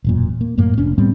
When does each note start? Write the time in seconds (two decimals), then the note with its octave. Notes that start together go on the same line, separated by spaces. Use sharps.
0.04 E1 F#2 A#2
0.41 A#3
0.57 F#2 A2 A#3
0.77 F1 C#4 D4
0.98 A2 G3 B3 C4